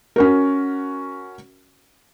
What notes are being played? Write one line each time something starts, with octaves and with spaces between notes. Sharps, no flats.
C#4 F#4 A#4